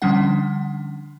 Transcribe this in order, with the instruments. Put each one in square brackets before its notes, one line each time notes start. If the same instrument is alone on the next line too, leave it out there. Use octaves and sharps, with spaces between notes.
[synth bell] D3 F3 G3 C#4 D4 F#5